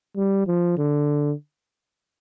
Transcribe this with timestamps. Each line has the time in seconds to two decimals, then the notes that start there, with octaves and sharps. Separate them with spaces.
0.16 G3
0.47 F3
0.78 D3